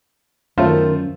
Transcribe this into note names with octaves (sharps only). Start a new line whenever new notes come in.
F#2 D#3 A3 F4 C5